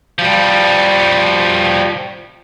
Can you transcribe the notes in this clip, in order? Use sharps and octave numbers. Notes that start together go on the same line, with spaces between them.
F3 G3